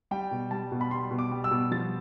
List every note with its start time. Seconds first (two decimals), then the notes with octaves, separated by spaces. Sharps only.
0.11 G3 G5
0.31 B2
0.51 G3 A5
0.72 B2
0.81 B5
0.91 G3 C6
1.11 B2
1.19 D6
1.31 G3
1.44 E6
1.51 B2
1.71 F3 A6